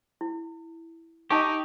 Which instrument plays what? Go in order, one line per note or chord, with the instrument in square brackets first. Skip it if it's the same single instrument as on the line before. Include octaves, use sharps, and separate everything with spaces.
[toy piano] E4
[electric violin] D#4 [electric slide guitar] G4 [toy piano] D#5 A5 C#6